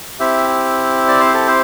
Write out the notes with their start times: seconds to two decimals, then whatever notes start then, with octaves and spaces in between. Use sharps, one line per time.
0.19 C4 E4 G4 E5
1.08 D5
1.20 C5
1.34 A4
1.48 C5